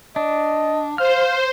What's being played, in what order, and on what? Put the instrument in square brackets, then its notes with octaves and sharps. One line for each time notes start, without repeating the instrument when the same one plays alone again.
[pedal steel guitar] D4 [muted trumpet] D#5
[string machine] C5 [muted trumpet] F5 [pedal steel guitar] F6